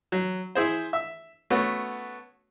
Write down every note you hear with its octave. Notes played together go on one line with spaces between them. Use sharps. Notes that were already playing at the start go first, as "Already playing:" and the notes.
F#3
E4 G#4 C5
E5
A3 B3 C#4 F#4 C#5